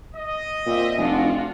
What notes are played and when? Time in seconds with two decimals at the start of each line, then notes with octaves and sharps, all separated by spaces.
0.15 D#5
0.66 A#2 C4 E5
0.98 F1 D4 F4 F#4